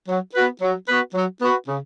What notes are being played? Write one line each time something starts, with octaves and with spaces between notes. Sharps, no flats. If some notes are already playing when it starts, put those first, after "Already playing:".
F#3
B3 F#4 B4
F#3
B3 F#4 B4
F#3
B3 F#4 B4
C#3